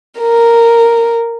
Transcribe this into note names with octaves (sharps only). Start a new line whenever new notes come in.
A#4